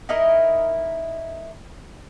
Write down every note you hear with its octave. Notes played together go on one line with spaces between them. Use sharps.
D#4 E4 A#4 D#5